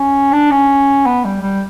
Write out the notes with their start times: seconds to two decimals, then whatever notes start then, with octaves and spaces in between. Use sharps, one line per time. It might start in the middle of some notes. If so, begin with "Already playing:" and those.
Already playing: C#4
0.32 D4
0.51 C#4
1.06 B3
1.24 G3
1.42 G3